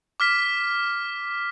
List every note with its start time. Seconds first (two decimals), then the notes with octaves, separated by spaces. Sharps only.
0.20 D6 F6 B6